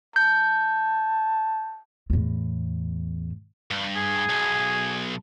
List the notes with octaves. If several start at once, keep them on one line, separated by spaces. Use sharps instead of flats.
A5 G6
E2 A2
G2
G#4
B1